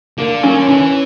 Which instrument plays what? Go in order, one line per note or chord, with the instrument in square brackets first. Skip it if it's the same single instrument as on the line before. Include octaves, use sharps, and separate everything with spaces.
[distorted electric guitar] D3 [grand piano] A#3
[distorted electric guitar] F#3 [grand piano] C#4
[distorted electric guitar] D3
[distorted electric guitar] E3 [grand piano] C#4